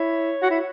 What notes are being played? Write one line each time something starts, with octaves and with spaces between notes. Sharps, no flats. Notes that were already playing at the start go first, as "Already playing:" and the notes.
Already playing: E4 C#5
F#4
E4